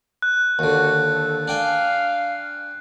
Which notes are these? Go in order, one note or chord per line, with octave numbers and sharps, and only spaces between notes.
F#6
D#2 D3 F#4
A4
D4 F5 G5 G#5